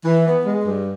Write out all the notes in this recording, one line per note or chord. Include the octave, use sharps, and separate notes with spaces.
E3
B3
G#3
G2